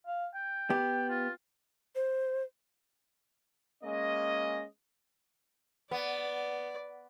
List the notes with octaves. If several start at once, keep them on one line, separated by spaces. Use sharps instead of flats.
F5
G5
B3 G4
F4
C5
G#3 A#3 C#4 D#5
B3 D5